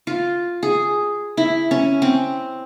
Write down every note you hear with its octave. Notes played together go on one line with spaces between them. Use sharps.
F4
G#4
E4
C#4
C4